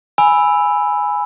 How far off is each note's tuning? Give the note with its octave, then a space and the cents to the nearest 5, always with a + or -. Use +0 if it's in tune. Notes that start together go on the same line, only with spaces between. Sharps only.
G#5 +0 B5 +0 E6 +0